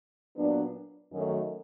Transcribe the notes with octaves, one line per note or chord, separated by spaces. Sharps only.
A#2 F#3 B3 D4
F#2 D#3 F#3 A3